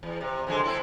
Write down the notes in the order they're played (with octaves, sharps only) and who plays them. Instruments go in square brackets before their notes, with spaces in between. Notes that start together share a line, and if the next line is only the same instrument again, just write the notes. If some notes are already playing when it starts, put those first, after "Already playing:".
[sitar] E2
C3
F2 D3 G#3
C4 E4 A4